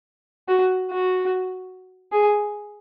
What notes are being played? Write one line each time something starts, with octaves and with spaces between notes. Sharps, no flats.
F#4
F#4
G#4